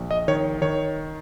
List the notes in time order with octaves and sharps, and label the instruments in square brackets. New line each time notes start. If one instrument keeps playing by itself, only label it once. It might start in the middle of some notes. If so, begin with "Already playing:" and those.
Already playing: [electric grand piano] A#1
D#5
D#3 C#5
D#3 C#5